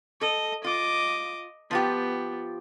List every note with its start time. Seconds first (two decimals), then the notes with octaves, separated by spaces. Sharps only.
0.21 A4 D#5
0.64 F4 D#5 D6
1.71 F3 B3 F4 G4